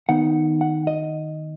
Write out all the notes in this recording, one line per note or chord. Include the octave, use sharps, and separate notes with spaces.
D#3 B3 D#4 F#5
F#5
D#5